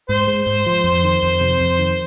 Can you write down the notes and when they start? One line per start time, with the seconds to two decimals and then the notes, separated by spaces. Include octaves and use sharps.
0.09 G#2 C5
0.27 G#3
0.47 G#2
0.66 F3
0.84 F2
1.04 D#3
1.23 F2
1.40 C3
1.60 F2
1.79 D#3